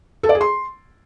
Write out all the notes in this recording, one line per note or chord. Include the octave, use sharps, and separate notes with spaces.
A4
D5
G#4
C6